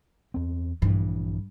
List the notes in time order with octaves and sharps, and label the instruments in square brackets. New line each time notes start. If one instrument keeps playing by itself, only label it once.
[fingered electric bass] E2 C4
[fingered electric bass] A#1 E3 [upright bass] G2